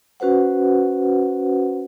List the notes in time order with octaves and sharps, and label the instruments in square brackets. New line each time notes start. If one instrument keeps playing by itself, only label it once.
[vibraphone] C#4 F#4 B4 C5 F#5